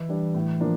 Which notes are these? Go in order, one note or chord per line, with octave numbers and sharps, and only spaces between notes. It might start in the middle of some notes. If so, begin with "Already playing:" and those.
Already playing: E3
G3 D4
A2
F3 A#3 D4